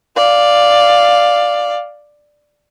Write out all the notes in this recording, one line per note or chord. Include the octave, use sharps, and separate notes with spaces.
D5 F5